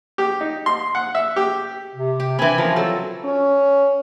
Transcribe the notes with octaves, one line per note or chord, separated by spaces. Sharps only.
G4
D#4
C6
F#5
E5
G4
C3
G4
E3 C4 D4 G#5 B5
F3 C#4 F4 A#4
F#3 A4
C#4